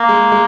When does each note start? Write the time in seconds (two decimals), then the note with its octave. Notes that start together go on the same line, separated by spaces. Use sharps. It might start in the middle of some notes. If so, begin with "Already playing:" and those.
Already playing: A#3
0.09 G#3
0.32 G#3